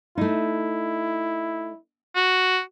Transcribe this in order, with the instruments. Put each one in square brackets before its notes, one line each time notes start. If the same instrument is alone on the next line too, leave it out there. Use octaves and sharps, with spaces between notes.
[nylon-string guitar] A3 D#4 [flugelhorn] E4
[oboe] F#4